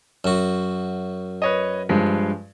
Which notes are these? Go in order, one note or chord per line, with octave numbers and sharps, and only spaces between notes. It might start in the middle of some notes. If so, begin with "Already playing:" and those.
F#2 F#4
B4 C#5 D#5
G2 F3 G#3